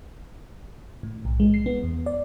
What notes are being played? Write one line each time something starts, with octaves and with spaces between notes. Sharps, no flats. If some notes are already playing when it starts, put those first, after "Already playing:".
A2
B1
G#3
C7
B3
E2
D5